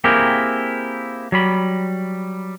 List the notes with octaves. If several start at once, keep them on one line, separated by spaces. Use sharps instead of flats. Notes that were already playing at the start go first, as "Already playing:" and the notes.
A#3 C4 E4 G4 G#4 A#4
F#3 G3 B5